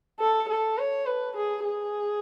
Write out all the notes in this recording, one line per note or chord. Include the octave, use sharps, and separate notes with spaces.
A4
A4
C#5
B4
G#4
G#4